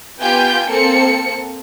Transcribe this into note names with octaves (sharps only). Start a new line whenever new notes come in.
B3 F4 G4 G5 G#5 G6
A#3 C4 A4 C#7